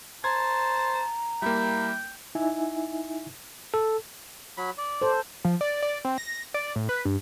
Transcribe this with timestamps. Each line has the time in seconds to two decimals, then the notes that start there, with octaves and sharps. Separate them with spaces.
0.24 C5 A5 A#5 G#6
1.42 G3 A#3 E4 G5
2.35 D#4 E4 E5 G#5
3.74 A4
4.57 F#3 B5
4.78 D5
5.02 A4 C5
5.45 F3
5.61 D5
5.82 D5
6.05 C4
6.18 A#6
6.54 D5
6.76 A2
6.89 B4
7.05 G2